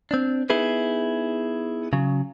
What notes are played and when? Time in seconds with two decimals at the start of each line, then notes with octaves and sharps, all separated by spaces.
0.11 C4 D4
0.50 B3 D#4 E4 G#4 B4
1.93 C#3 F#3